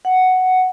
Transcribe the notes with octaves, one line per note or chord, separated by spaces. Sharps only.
F#5